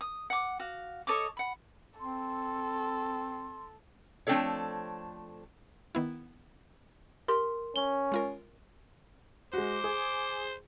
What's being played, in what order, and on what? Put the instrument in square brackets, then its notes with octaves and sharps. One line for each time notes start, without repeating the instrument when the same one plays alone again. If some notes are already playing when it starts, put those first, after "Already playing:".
[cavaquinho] D#6
F#5 D6
F#4 F5
A4 C#5 D#5 D6
F#5 B5
[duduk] C4 [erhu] A4 [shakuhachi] C6
[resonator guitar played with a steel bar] F3 A3 C4 D4 A4 C#5
[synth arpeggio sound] D#3 B3 E4
[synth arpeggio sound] G4 [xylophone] A#4 C6
[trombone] C#4 [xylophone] G7
[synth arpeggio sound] G#3 F4 A#4
[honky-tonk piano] G#3 F#4 [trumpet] C5 [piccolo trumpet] D6
[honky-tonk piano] G#4